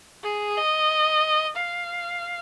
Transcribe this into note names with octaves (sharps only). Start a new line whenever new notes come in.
G#4
D#5
F5